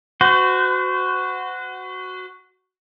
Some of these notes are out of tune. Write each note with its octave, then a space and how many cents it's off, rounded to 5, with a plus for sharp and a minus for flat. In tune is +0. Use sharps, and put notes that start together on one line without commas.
F#4 +0 C5 -40